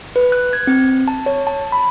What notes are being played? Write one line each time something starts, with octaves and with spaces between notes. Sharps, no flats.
B4
F#6
G#6
C4
A5
C#5
A5
B5